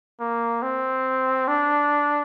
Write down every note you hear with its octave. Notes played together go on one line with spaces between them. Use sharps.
A#3
C4
D4